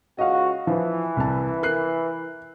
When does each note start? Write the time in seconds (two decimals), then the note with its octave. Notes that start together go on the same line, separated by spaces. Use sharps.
0.18 C#2 F#4 D#5 F5
0.67 E3 F3
1.17 C2 A5
1.63 A#4 F#6 C7